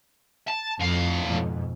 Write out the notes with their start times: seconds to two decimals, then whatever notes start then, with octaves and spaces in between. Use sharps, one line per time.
0.48 A5
0.80 F2 A2 F5
1.26 F2 G#2 B2